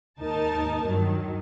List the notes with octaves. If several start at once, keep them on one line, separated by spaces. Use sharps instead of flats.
D#2 G#2 D#4 A#4 A5
G2 D#3 F#3